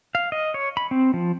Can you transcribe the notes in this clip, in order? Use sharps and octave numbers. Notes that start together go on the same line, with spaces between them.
F5
D#5
C#5
B5
C4
F3